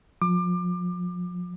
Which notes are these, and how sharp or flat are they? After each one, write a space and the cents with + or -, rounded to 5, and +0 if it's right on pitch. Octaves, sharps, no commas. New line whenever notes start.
F3 +35 D6 +30